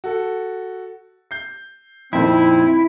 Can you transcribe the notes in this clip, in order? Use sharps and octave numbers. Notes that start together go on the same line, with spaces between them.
F#4 A4
G6 C7
F2 A#2 D#3 C4 E4